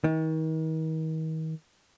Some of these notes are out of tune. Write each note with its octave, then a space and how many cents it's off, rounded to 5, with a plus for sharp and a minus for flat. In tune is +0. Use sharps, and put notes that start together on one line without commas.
D#3 +35